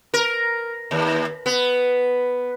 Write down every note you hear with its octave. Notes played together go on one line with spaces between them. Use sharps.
A#4
D#2
B3